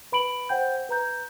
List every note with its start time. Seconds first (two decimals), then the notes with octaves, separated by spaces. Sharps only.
0.12 B4 B5 D7 F#7
0.49 C5 F#5 G5 G6
0.89 B4 A#5 G6